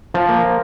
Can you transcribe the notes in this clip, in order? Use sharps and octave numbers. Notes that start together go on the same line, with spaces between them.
F3
A#3